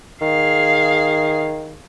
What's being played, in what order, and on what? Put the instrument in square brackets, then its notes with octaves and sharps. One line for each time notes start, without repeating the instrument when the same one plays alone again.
[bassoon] D#3 [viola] G#4 F5